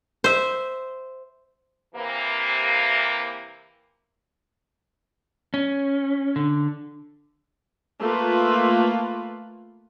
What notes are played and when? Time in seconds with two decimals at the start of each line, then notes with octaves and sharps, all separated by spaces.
0.24 C5 E5
1.95 C3 E3 A#3
5.54 C#4
6.36 D3
8.00 A3 A#3 F4 B4